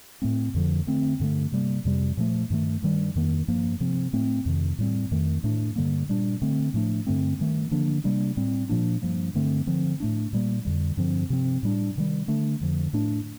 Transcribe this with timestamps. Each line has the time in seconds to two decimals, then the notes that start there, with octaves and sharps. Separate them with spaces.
0.22 A2 A3 C4
0.54 F2 D3 F3
0.87 D3 A3 C4
1.20 G2 D3 A3
1.52 C3 G3 A#3
1.85 F2 C3 G3
2.17 A#2 F3 A3
2.50 G2 D#3 A3
2.83 G2 D#3 G3
3.15 F2 D#3 A#3
3.48 G2 F3 A#3
3.80 C3 F3 C4
4.13 A2 A3 C4
4.46 F2 C3 D#3
4.78 A2 G3 C4
5.11 F2 D#3 A3
5.44 A2 A3 D4
5.76 G2 D3 G3 A#3
6.09 A#2 G3 D4
6.42 D3 A3 C4
6.74 A2 F3 A3 D4
7.07 G2 D3 A3 C4
7.39 G2 D#3 A3
7.71 D3 F3 A#3 D4
8.04 C3 G3 A#3 D4
8.37 A2 G3 C4
8.69 A#2 F3 A#3 D4
9.02 G2 F3 A#3
9.35 G2 D3 A3 C4
9.67 D3 F3 C4
10.00 A2 A3 D4
10.33 A#2 G3 A#3
10.65 F2 D3 G3
10.97 G2 D3 F3 C4
11.30 C3 F3 C4
11.63 A2 G3 D4
11.95 C3 D#3 G3
12.28 D3 A3 D4
12.61 F2 D3 F3
12.93 A2 A3 D4